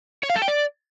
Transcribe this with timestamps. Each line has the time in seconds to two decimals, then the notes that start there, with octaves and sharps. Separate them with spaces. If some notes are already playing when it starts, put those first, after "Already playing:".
0.23 C#5
0.30 F5
0.36 A4
0.42 G5
0.48 D5